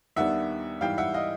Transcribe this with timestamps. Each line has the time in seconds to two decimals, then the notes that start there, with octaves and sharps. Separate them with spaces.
0.16 D#2 D#3 G3 B3 D4 E5 F#5
0.81 G#2 E3 G3 F5 G5
0.98 E5 F#5
1.14 D#5 F5